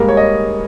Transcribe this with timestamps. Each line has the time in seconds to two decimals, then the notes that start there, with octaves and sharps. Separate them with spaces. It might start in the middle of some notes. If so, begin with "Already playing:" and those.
Already playing: G#2 G3 A#3 A#4
0.09 C#5
0.17 D#5